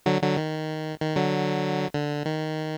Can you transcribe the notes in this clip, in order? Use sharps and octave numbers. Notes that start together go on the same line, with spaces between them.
D3 F#3
D3 F#3
D#3
D#3
D3 F#3
D3
D#3